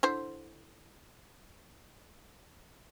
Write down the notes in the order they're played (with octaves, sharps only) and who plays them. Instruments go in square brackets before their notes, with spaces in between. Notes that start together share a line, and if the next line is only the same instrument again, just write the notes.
[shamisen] D3 E4 C5